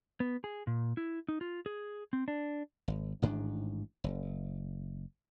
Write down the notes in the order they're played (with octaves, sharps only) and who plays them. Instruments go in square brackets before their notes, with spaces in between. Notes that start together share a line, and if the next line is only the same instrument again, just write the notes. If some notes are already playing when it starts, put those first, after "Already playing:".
[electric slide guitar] B3
G#4
A#2
E4
D#4
F4
G#4
C4
D4
[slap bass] G#1
A1 G#2 D#3 D4
F#1